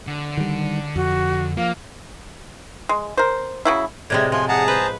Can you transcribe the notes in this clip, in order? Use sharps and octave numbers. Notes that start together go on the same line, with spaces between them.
D3
D#3 G3
F2 F#4
F3 A#3 F5
G#3
A#4 C5
C#3 F#3 E4
A2 C3 G#3 D5 G#6
F3 G#5 C6
G#4 F#5 A5 A#5
B4 C5